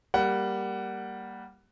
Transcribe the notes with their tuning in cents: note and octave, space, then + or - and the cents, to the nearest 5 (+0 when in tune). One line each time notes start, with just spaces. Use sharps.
G3 +0 A#3 +0 F#5 +15